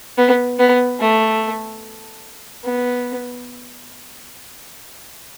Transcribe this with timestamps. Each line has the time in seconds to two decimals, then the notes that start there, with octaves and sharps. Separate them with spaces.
0.18 B3
0.59 B3
1.00 A3
2.64 B3